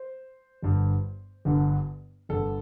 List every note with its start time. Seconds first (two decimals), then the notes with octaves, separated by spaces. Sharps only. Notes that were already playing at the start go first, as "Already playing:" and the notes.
Already playing: C5
0.62 G1 G2 D3
1.45 G1 G2 D3
2.29 G1 G2 D3 A4